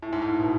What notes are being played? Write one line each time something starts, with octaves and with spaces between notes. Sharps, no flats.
A2
G#2
A2
B2